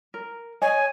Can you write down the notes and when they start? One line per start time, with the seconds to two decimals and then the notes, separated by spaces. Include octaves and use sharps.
0.14 A#4
0.62 C#5 D#5 G#5